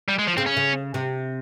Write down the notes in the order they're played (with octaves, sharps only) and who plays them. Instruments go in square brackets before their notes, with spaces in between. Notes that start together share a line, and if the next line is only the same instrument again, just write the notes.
[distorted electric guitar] G3
G#3
F3
[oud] C#3 [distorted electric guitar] C4
[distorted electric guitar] C#4
[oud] C#3
C3